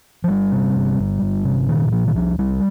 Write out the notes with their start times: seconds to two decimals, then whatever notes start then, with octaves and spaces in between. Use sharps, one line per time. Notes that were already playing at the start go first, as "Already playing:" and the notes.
0.24 F3
0.28 G1 G3
0.52 C3
0.75 G1
0.98 G1
1.22 G1
1.45 C3
1.68 A#2 D#3
1.88 D#3
1.92 A#2 F3
2.08 D#3
2.15 C2 F3
2.38 C2 G3